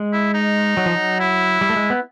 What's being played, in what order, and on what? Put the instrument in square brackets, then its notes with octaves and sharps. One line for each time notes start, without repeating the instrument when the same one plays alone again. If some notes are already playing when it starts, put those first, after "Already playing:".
Already playing: [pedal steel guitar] G#3
[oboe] E4
D#4
[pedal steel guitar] F#3
F3
F#3
[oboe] E4
[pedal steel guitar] G3
A3
G#3
B3